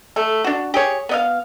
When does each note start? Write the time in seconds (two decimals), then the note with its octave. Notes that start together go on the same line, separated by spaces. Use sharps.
0.16 A3 A4
0.44 D4 F#4
0.74 G4 G#4 C#5
1.09 B3 D#5 F5